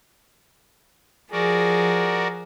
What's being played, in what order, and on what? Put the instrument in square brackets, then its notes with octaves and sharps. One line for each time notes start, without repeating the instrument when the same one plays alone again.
[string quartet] F3 G#4 [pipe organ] F#4 A#4 D5